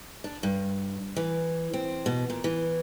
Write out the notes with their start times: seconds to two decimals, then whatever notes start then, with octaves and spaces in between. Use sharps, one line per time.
0.24 D4
0.43 G2
1.16 E3
1.73 C4
2.06 B2
2.30 A#2
2.44 E3